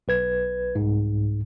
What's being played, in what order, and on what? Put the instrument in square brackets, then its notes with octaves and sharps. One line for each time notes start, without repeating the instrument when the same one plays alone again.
[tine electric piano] B1 B4 G#6
C2 G#2